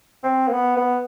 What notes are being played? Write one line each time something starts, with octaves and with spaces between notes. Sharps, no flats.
C4
A#3
B3
B3